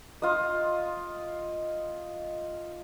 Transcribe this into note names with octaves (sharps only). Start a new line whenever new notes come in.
F4 D#5